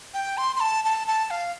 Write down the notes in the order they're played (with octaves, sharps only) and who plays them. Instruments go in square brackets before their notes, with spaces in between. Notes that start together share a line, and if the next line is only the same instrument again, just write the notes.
[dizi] G5
C6
C6
A5
A5
A5
F5